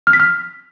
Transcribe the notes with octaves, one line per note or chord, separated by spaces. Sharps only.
F6
B6
F6